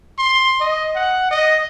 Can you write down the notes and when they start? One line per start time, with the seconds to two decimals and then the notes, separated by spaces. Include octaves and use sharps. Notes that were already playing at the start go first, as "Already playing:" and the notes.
0.18 C6
0.60 D#5
0.95 F#5
1.31 D#5